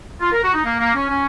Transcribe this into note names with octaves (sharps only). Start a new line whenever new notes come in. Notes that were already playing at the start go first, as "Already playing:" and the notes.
F4
A#4
F#4
D#4
A#3
A#3
C#4
C#4